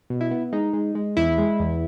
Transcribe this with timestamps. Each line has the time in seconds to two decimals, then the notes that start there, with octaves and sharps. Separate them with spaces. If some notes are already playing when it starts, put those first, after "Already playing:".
0.10 B2
0.21 E4
0.31 B3
0.52 G#3 D#4
0.74 G#3
0.95 G#3
1.17 E2 E4
1.38 G#3
1.60 E2